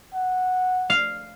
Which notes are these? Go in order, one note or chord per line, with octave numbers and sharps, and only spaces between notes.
F#5
F5